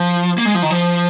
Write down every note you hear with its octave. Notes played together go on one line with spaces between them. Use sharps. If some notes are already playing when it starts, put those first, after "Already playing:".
Already playing: F3
A#3
G#3
F3
D#3
F3